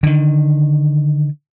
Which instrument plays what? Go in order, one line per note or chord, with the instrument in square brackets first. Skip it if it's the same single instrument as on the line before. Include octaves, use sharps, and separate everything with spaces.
[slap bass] D3 D#3